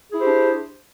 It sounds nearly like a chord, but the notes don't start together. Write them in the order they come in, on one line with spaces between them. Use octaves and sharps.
G#4 E4 C5 G4 D4